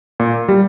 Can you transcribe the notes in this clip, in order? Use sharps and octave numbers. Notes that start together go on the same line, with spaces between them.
A#2
G3